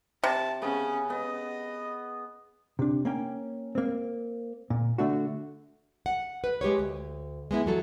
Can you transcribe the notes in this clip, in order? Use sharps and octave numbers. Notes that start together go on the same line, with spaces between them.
C3 A5
C#3 B3 C#4
B3 D#5
C3 D4
A#3 C#4 G5
A#3 C4
A#2
D3 A3 D4 F#4
F#5
B4
G#3 G4 B4 C#5
D2
G#3 B3 E4
E3 F#3 A4